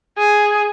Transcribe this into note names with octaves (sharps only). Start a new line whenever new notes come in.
G#4